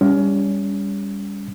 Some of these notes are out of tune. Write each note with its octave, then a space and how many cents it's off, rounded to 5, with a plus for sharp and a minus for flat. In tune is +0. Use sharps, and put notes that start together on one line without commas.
G3 +30 C#4 +25